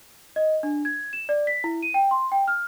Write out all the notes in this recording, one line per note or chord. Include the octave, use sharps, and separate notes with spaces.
D#5
D4
G#6
E7
D5
B6
E4
D#7
G5
C6
G5
F6